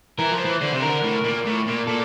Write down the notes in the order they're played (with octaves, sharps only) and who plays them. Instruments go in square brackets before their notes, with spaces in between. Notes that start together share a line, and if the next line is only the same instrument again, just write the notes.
[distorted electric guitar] E3 [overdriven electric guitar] A#4
[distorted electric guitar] F3
[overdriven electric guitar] C5
[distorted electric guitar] E3
[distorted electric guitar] D3 [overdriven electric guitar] C5
[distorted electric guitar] C3
[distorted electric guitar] D3 [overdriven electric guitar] A#4
[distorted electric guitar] A2
A#2
A2
A#2
[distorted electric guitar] A#2 [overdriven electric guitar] A4